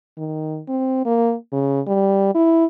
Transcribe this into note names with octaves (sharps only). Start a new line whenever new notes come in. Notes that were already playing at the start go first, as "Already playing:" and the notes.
D#3
C4
A#3
C#3
G3
E4